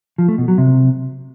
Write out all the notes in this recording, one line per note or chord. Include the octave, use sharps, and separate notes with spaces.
F3
A3
B2
F#3
C3